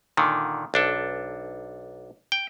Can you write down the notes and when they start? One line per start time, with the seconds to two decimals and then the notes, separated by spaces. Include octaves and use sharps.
0.17 A#2 D3 D#3
0.74 B1 D4 A4
2.32 G5